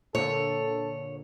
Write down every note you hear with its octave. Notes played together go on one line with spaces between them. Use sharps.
A#2 D3 A4 C#5